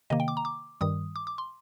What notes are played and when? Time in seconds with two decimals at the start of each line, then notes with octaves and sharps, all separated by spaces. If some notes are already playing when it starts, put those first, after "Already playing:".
0.10 C3 D#3 A#3 D#5
0.20 G5
0.28 D6
0.37 A#5
0.45 D6
0.81 G2 D#3 G3 D#6
1.16 D6
1.27 D6
1.38 C6